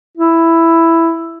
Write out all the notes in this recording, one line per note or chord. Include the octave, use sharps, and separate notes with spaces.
E4